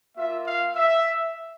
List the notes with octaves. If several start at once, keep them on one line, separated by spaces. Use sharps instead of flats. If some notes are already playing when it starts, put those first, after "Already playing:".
A#3 F4 E5
F5
E5